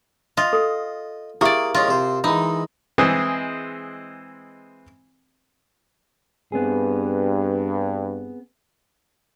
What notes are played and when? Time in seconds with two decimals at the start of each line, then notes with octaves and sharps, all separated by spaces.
0.37 F4 D#5
0.53 A4
1.41 A#3 E4 G4 G#4 D5 E5
1.75 G#3 C#4 F4 A#4
1.88 C3 C5
2.24 E3 G#3 D#4 B5
2.98 E3 G#3 C4 G#4
6.52 G2 B3 C4 G#4